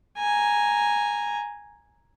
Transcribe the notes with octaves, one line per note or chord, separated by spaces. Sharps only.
G#5 A#5